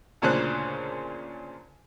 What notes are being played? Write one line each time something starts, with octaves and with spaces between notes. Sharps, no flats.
D2 A#2 C#3 D4 C5 F#6